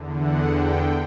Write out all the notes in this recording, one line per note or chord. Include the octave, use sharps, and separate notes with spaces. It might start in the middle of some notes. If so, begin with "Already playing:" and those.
Already playing: E2 D3
F#5
G5